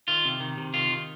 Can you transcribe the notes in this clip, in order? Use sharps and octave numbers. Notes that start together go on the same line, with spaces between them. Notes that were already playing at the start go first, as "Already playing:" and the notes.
D#3 F4
C3
D#3
C3
D#3 F4
D#3